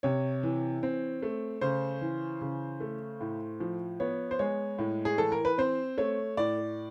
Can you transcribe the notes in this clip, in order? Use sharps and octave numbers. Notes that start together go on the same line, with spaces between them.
C3 C#5
E3
C4
A3
C#3 C5
E3
C#3
A3
A2
F3
B3 C#5
C5
G#3 C#5
A2
G#4
E3 A4
A#4
B4
C4 C5
A3 C#5
A2 D5